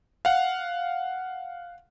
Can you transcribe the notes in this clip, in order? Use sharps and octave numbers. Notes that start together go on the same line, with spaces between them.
F5 F#5